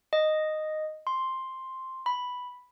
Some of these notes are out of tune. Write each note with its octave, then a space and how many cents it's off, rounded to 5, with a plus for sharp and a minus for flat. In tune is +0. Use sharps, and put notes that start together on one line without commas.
D#5 -5
C6 +5
B5 +0